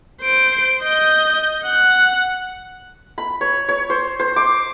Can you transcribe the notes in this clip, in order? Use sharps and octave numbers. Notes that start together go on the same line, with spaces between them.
C5 D7
D#5 G6
F#5
B5
C#5
C#5
C5
C5
D6